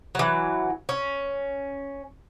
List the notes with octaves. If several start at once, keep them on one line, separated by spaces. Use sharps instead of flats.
E3 F#3
C#4